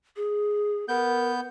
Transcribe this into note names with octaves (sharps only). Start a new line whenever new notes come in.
G#4
B3 A#4 G6